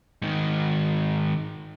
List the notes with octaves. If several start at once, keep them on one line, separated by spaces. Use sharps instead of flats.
G#2 D#3